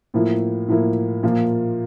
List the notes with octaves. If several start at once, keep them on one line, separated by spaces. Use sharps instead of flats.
A2 F3 A#3 E4
A2 F3 A#3 E4
A#2 F3 A#3 F4